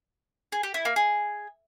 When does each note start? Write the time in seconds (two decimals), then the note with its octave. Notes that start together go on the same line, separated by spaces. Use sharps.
0.52 G#4
0.63 G4
0.74 E4
0.85 A#3
0.96 G#4